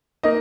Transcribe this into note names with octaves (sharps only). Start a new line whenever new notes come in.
A#3 D#4 D#5